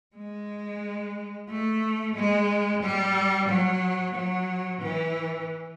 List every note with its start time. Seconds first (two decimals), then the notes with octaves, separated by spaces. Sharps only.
0.16 G#3
1.48 A3
2.15 G#3
2.82 G3
3.48 F#3
4.14 F#3
4.81 E3